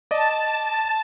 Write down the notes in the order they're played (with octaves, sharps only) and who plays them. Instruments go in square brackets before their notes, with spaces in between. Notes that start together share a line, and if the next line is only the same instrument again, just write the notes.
[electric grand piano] D5 D#5 [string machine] A5